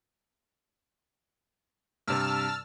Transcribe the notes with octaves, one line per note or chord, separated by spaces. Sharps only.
G2 C3 A5 E6 F6